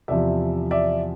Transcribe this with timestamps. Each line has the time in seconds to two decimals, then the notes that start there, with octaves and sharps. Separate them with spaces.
0.08 E2 C3 F3 D5 E5
0.71 D5 E5